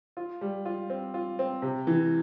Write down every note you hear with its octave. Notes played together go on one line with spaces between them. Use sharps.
F4
G3
F4
C4
F4
C4
C3
E3